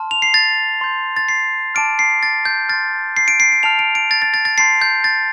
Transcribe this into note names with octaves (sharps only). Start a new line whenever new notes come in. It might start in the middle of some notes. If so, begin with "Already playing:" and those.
Already playing: A5 C6 F6
F7
C7
A6
C6 G6
A6
C7
A5 D6 F6 D7
C7
A6
G6
C6 F6 A6
C7
D7
C7
D7
A5 F6 F7
D7
D7
A6
A6
A6
A6
A5 C6 G6 C7
G6
A6